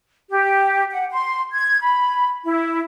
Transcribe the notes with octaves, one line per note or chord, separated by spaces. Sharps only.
G4
F#5
C6
G#6
B5
E4